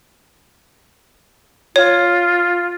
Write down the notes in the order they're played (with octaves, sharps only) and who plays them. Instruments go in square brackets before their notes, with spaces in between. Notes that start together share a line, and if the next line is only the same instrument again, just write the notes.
[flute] F4 [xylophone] C#5